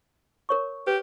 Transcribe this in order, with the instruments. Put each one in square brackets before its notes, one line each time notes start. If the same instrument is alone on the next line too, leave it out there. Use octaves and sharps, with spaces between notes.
[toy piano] A#4 C#5 C#6
[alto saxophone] G4 [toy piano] B4